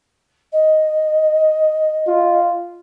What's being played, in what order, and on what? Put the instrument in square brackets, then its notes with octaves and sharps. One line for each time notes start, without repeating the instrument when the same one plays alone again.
[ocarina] D#5
[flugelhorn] F4